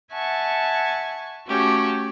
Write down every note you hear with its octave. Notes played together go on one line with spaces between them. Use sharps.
E5 F#5 G#5 A5 C#6
A3 C#4 F#4 G4